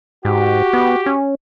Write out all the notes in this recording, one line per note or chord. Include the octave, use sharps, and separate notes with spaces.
G#2 F#4 G4
B3
C#4